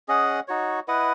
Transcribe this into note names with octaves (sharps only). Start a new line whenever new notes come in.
C#4 G#4 D#5 F#5
D#4 F#4 C#5
E4 B4 D#5 F#5